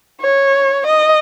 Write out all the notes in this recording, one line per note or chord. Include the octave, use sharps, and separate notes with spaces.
C#5
D#5